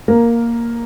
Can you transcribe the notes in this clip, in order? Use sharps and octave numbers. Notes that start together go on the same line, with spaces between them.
A#3 A#4